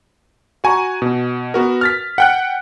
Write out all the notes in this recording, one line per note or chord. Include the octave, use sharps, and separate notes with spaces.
F#4 G#5 A#5 C#6
B2
B3 F#4 A#4
F6 A6 B6
F#5 G5 F#6